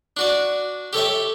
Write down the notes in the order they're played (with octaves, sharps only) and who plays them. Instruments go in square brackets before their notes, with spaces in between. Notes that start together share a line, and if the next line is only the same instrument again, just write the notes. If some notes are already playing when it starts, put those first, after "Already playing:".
[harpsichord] D4 F#4 D5
G4 A4 C#5 E5